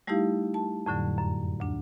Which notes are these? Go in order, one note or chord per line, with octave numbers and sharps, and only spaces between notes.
G3 A3 D#4 E4 G4 F5
A5
F2 A2 D3 F#3
F#2
D2 D4